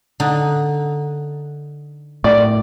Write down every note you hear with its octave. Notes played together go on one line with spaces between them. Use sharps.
D3 D#4
A2 D5